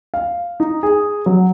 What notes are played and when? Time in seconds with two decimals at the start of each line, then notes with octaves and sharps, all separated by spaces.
0.14 F5
0.60 D#4
0.83 G#4
1.26 F#3